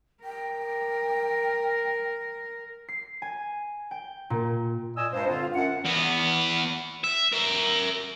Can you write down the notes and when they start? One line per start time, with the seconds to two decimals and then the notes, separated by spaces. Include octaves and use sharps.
0.24 A#4 G5
2.89 C7
3.22 G#5
3.91 G5
4.30 A#2
4.97 A#2 F4 D#5 G#5 E6
5.12 C#2 G2 C5
5.28 G2 D3 C4 F4
5.55 F#2 F#5
5.85 E2 B3
7.04 E5
7.32 A#4 E5